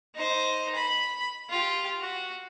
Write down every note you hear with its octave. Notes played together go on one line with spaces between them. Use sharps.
D#4 C5
B5
F4 G4
F#4